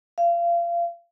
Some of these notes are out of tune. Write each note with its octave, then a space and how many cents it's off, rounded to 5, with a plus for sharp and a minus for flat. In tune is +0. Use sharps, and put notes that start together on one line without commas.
F5 -30